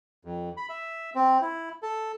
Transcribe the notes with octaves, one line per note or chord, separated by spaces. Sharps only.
F2
B5
E5
C4
E4
A4